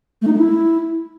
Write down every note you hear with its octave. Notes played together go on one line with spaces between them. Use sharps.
A3
D#4
A3
E4